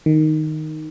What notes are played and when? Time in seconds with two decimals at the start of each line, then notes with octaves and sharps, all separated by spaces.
0.06 D#3